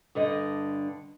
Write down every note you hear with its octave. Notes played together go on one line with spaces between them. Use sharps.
G2 D3 D#5